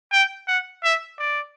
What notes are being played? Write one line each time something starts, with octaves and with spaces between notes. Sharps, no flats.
G5
F#5
E5
D5